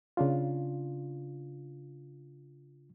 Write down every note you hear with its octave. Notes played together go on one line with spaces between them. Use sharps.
C#3 D4 F4